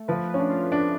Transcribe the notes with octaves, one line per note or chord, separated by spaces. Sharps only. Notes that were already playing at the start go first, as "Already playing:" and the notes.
Already playing: A3
F3 B4
C#4 B4
D4
F4
D4 B4